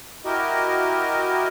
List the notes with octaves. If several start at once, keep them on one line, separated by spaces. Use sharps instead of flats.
E4 F#4 G4 A#4 D#5